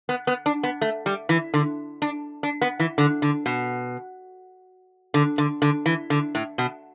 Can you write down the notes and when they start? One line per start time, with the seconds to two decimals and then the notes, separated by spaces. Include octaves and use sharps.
0.09 B3
0.27 B3
0.46 D4
0.63 B3
0.81 A3
1.06 G3
1.29 E3
1.54 D3
2.02 D4
2.43 D4
2.61 B3
2.80 E3
2.98 D3
3.22 D3
3.46 B2
5.14 D3
5.38 D3
5.62 D3
5.86 E3
6.10 D3
6.35 A2
6.58 B2